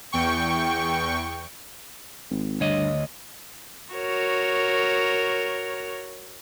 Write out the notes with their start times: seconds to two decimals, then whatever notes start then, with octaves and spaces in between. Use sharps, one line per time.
0.12 E2 G5 C#6
2.30 G#1
2.60 D2 G2 C#5 D#5
3.94 F#4 A#4 C#5